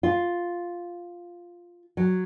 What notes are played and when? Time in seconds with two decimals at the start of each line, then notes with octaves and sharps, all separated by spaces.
0.03 F4
1.97 F#3